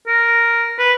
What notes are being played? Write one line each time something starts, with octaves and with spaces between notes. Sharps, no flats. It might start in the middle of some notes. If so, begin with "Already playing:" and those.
A#4
B4